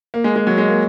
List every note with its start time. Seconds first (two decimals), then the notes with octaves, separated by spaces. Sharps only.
0.14 A#3
0.24 G#3
0.36 G#3
0.47 F#3
0.58 G#3
0.68 A#3